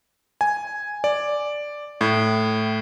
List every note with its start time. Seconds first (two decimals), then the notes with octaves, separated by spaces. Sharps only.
0.41 G#5
1.04 D5
2.01 A2